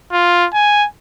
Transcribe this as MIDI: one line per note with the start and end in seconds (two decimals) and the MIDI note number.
0.12 0.47 65
0.54 0.86 80